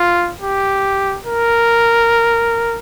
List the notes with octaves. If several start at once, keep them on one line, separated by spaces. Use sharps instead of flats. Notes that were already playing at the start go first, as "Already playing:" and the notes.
Already playing: F4
G4
A#4